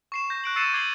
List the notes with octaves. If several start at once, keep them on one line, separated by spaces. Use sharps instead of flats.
C#6 C7 E7
G6 A#6
F#6 D7 F#7
E6 A6 C7 C#7 D#7 E7
D6 G#6 C7 D#7 F#7 G7